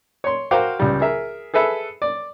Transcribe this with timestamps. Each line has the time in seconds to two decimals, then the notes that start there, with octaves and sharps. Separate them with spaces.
0.24 C#5 C6
0.51 F#4 A#4 C5 F5 G5 D6
0.80 C#2 G3
1.01 G#4 A#4 E5
1.54 G#4 A4 B4 E5
2.02 D5